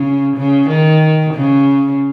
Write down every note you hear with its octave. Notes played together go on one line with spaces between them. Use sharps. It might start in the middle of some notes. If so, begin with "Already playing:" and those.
Already playing: C#3
C#3
D#3
C#3